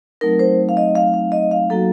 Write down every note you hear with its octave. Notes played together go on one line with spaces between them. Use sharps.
F#3 A3 C4 D#4 A#4
C5
F5
D#5
F5
F5
D#5
F5
F#3 A#3 D#4 F#4 A4